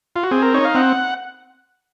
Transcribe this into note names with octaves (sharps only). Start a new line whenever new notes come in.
F4
F#4
C4 G#4
A#4
D#4 C#5
F5
C4 F#5